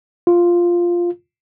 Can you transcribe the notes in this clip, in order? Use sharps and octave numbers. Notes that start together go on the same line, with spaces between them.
F4